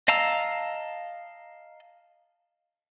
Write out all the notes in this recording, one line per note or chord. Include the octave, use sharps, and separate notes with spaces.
D#5 F5 A5 A#5 E6